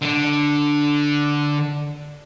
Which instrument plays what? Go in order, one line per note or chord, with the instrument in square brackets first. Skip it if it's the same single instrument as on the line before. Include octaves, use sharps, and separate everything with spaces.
[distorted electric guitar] D3 D4